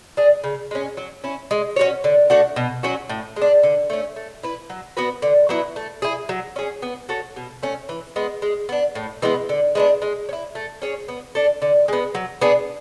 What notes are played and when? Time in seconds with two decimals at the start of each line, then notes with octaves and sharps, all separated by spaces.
0.17 D4 G#4
0.44 C#3
0.71 G#3 C#4
0.97 F#3
1.24 C#4 E4
1.51 G#3
1.76 C#4 F#4 C#5
2.04 D3
2.30 A3 D4 F#4
2.56 B2
2.83 F#3 C#4 F#4
3.09 A2
3.36 G#3
3.42 D4
3.63 D3
3.90 A3 C#4
4.16 A3
4.43 E4 B4
4.70 F#3
4.97 B3 F#4 B4
5.22 D3
5.49 F#3 B3 E4
5.76 A3
6.02 E4 G#4
6.29 F#3
6.56 C#4 G#4
6.82 B3
7.09 F#4 A4 C#5
7.36 B2
7.63 A3 C#4
7.89 E3
8.16 G#3 B3
8.42 G#3
8.69 B3 D4
8.95 A2
9.22 E3 G#3 B3
9.49 D3
9.75 G#3 B3 D4
10.02 G#3
10.29 C#4
10.33 E4
10.55 A3
10.82 C#4 G#4 C#5
11.08 B3
11.35 D4 A4
11.62 D3
11.88 G#3 B3
12.15 F#3
12.41 B3 D4 G#4